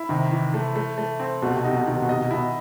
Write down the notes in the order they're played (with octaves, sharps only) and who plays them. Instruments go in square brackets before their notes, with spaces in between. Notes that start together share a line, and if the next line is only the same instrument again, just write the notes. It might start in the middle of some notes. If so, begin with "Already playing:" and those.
Already playing: [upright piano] E4
[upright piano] C3 [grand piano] D#3
[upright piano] E3
A3
A3
A3
C4
[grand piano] B2 [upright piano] A3
[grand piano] C3
B2
[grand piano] C3 [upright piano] D#4
[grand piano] B2
C3
[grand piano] B2 [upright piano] D#3
[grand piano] C3
B2
[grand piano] C3 [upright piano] D#5
[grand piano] B2
C3
[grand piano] B2 [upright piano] E4